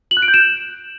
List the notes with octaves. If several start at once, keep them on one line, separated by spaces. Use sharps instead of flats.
F#7
F#6
D7
G6
E7